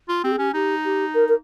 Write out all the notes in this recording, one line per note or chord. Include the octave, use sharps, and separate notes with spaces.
F4
C4 G4
G#4
C#4 G4
D#4 G4
G4
A#4
A#4